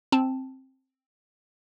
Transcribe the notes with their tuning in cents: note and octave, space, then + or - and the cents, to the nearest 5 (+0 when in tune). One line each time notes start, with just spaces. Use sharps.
C4 +10 A5 +0